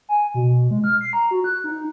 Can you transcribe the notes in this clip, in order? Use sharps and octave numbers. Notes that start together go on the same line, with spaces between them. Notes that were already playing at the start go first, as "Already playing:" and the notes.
G#5
B2
G#3
F6
C7
A#5
F#4
F#6
D#4